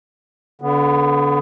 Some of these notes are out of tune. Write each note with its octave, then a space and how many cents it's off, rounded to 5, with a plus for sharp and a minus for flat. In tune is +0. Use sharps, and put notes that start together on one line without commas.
D3 -30 B3 +0